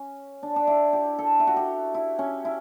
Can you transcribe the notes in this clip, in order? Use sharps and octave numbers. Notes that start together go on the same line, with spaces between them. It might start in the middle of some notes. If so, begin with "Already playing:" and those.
Already playing: C#4
D4
D4
E4
G4
A4
E4
F#4
G4
E4
C#4
E4